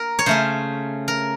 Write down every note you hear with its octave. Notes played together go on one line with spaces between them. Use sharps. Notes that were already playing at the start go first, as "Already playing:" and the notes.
Already playing: A#3 A#4
C#5
C#3 A3 C#4 C5
A#4